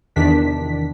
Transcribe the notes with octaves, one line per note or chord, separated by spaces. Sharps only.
E2 C3 D#3 D4 B6